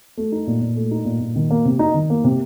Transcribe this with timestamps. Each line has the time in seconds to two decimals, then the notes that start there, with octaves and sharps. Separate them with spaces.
0.17 A3
0.32 D#4
0.47 A#2
0.61 A#2
0.76 A3
0.91 D#4
1.05 A#2
1.20 A#2
1.36 D#3
1.51 A#3
1.65 C3
1.79 D#4
1.94 D#3
2.10 A#3
2.24 C3